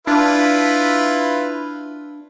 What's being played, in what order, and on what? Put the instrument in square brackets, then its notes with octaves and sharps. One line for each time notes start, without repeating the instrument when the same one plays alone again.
[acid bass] D4 [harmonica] E4 F4 B4